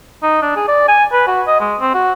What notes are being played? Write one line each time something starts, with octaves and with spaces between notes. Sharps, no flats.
D#4
D4
G#4
D5
G#5
B4
F#4
D#5
G#3
C4
F#4